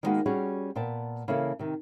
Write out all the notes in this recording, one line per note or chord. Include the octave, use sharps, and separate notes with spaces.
D#3 G3 G#3 A#3 B3 F#4
G3 C#4 F#4 G#4
A#2 B3 G5 A5
C#3 E3 A#3 E4 A4
C3 D#3